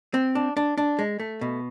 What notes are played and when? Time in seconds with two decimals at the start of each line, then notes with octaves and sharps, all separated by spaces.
0.14 C4
0.35 D4
0.57 D4
0.78 D4
0.99 G#3
1.20 A3
1.41 B2